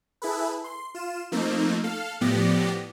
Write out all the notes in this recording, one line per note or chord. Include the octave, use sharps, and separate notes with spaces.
E4 G#4 A4 B4
C6
F4 E7
F3 A3 A#3 C4 D#4
A4 F5
A2 F3 B3 G4 D5 A#6